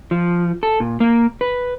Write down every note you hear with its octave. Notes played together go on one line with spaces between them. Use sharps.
F3
A4
A#2
A#3
B4